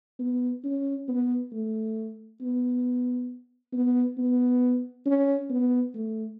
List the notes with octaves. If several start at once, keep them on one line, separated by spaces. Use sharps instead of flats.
B3
C#4
B3
A3
B3
B3
B3
C#4
B3
A3